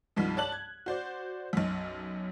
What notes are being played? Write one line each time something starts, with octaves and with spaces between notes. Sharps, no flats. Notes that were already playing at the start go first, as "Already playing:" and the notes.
C2 G2 D#3 F3
C#5 D5 A5 F#6 F#7
G#6
F#4 C5 D5
B1 F#2